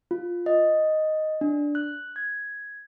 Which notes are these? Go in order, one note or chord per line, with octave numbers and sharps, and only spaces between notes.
F4
D#5
D4
F#6
G#6